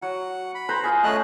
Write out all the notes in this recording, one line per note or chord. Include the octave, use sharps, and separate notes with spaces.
F#3 F#5
B5
B4 C5 A#5
F4 G#4
A3 C#4 D#5 A5 F#6